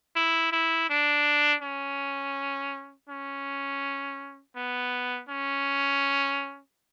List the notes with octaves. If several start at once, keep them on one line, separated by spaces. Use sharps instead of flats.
E4
E4
D4
C#4
C#4
B3
C#4